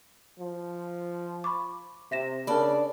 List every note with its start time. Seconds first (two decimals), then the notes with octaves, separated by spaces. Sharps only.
0.39 F3
1.44 B5 C#6 D6
2.12 C3 E5 A#6 E7
2.47 C#3 D4 A#4 D5 A5 B5